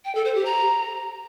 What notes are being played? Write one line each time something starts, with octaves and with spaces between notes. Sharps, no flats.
G5
A4
C5
G4
A#5